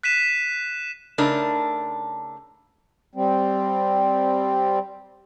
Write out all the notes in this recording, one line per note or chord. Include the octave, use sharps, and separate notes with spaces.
F#6 B6 D#7 E7
C#3 A3 D4 D#4 A#4
G3 C4